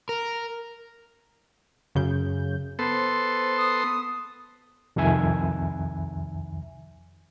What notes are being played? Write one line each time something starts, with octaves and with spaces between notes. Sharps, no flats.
A#4
F#2 C#3 G6
B3 A4 C5 C6
D#6
C2 F2 D#3 E5 G#5